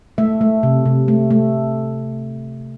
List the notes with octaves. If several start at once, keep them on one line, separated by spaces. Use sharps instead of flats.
A3 E5
A3
C3
C3
A3
A3